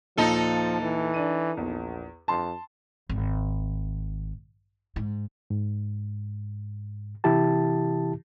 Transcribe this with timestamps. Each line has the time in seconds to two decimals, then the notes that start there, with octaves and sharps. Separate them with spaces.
0.17 D#2 A#2 F3 D#4 A4
0.82 E3
1.14 D4 D#7
1.57 A#1 E2
2.28 F2 A5 C6
3.09 G#1
4.96 G#2
5.50 G#2
7.24 C3 E3 E4 G4 A5